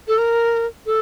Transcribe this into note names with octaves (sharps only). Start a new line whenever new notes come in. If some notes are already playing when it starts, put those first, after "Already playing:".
A4
A#4
A4